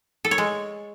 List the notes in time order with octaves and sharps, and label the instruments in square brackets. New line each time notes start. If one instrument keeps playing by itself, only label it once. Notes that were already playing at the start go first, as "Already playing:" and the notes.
[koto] A4
C#5
G#3